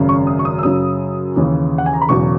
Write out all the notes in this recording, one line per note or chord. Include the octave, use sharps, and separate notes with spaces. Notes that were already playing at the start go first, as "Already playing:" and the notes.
Already playing: G#1 F#2 C#3
C#6
D#6
C#6
D#6
E6
F#2 C#3 F#3 D#6
D#2 C#3 E3
F#5
G#5
A#5
B5
E1 E2 C#3 F#3 C#6